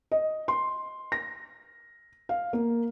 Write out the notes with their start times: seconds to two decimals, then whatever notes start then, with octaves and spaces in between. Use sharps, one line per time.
0.12 D#5
0.48 C6
1.12 A#6
2.29 F5
2.53 A#3